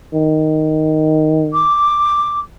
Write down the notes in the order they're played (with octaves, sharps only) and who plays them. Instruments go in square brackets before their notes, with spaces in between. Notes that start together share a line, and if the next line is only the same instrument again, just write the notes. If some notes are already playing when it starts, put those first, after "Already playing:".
[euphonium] D#3
[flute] D6